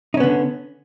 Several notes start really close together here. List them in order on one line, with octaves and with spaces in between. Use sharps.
D#4 C#4 B3 D3